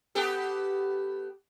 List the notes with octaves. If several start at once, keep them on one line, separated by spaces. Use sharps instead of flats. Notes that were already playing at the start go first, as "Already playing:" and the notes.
B3 G4 A4